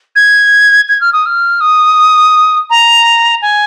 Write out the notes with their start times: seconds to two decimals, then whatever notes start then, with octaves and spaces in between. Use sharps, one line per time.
0.16 G#6
0.89 G#6
1.01 F6
1.13 D#6
1.26 F6
1.61 D#6
2.70 A#5
3.42 G#5